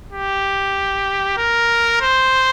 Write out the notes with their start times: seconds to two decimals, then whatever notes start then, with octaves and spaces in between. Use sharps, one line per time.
0.12 G4
1.37 A#4
2.01 C5